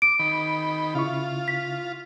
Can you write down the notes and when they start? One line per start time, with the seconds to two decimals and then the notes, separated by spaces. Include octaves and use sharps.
0.02 D6 D7
0.19 D#3 B5
0.95 C#3 E4 F4 C#6
1.48 B6